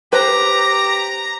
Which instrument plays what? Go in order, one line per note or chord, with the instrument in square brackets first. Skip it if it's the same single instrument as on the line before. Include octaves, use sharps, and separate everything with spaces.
[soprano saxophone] G4 [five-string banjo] B4 C5 [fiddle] A#5